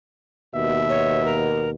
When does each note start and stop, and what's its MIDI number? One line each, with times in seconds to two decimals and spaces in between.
0.55 1.75 39
0.55 1.75 47
0.55 1.45 76
0.89 1.23 73
1.24 1.70 70